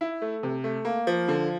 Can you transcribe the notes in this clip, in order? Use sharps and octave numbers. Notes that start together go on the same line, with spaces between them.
E4
A3
C3
A3
A#3
F3
D3